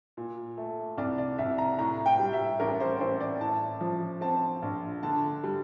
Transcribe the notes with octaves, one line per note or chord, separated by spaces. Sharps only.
A#2
A3
C2 D5
D5
C2 E5
A#5
A2 A#5
G5
G3
E5
A1 A#4
C5
A1 C5
D5
A2 A5
F3
C4 A5
A#1
D3 A5
G3